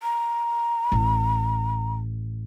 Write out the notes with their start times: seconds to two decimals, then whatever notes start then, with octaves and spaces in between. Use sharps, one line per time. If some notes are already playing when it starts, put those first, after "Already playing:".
0.03 A#5
0.92 A1